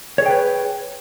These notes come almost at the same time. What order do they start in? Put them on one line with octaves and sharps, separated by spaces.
C#5 G#4 G5 B4